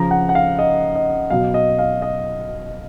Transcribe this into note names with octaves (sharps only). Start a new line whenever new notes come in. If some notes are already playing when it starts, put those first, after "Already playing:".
Already playing: C#3 F3 A#5
F#5
F#5
F5
D#5
D#5
B2 F#3 F5
D#5
F5
D#5